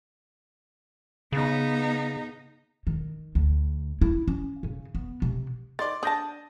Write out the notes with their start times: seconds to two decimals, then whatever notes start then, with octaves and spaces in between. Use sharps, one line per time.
1.32 C#3 B3 D#4
2.87 D#3
3.35 D2
4.02 E4
4.28 C#4
4.63 C#3
4.95 B3
5.22 C3
5.79 D#3 D5 C6 A6
6.03 D4 A5 D#6 G6 A#6